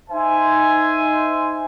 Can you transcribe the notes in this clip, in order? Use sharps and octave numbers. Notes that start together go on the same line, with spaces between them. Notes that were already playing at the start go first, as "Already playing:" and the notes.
D#4 C5 E5 G#5